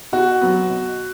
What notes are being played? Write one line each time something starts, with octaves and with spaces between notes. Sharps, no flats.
B2 F#4
F#3 B3
B2